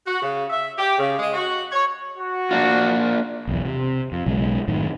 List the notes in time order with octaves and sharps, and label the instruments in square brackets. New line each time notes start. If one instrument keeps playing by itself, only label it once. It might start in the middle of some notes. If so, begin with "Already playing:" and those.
[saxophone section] F#4
C#3
E5
G4
C#3
G#3
F#4
C#5
[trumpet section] F#4
[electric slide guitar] A#3 D4 F4
[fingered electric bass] B1 E2
C3
F2
B1 C#3 G#3
F#2 A2 D#3